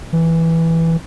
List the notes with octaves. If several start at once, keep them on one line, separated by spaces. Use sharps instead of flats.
E3